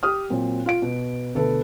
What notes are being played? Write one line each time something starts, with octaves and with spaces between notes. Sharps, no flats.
G4 D#6 F6
A#2 F#3 C4
F4 F5 D7
B2
D2 B2 A4 B4